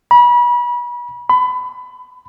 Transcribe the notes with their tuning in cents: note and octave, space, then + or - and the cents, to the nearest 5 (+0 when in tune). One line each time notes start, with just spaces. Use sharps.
B5 -35
B5 +25